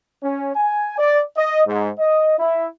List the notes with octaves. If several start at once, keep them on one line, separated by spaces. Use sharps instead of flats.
C#4
G#5
D5
D#5
G#2
D#5
E4